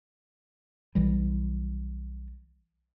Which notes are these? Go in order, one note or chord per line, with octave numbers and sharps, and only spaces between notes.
B1 E3 G3